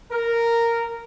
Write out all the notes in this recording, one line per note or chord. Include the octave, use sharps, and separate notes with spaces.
A#4